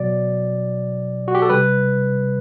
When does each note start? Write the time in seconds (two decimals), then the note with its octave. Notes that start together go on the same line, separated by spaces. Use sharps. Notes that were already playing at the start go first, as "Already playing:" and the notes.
Already playing: B2 F#3 D5
1.28 F#4
1.35 G4
1.42 A4
1.49 C3 G3 B4